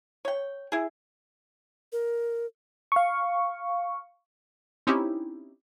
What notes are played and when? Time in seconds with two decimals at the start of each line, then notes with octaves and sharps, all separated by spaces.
0.25 C#5 G5
0.72 E4 G#4
1.92 A#4
2.92 F5 C#6
4.87 C4 C#4 D#4 E4 G4